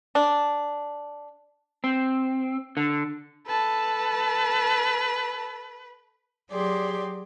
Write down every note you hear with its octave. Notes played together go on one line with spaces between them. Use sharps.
D4
C4
D3
A4 B4 A5
F#3 G4 G#4 D5 C6